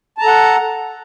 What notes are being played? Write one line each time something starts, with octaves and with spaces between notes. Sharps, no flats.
A4 F#5 A5 A#5